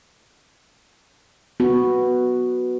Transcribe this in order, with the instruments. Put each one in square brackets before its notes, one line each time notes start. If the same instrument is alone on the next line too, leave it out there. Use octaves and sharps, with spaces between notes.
[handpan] B3 F#4